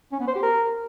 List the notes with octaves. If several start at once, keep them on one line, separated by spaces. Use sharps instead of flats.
C#4
B3
C5
G4
A#4